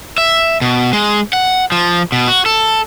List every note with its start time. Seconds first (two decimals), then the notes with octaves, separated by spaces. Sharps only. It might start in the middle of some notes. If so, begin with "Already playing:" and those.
0.18 E5
0.61 B2
0.93 G#3
1.33 F#5
1.72 F3
2.12 B2
2.28 F#4
2.46 A4